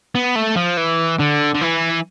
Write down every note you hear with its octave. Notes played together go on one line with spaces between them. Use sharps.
B3
A3
F3
E3
D3
D3
E3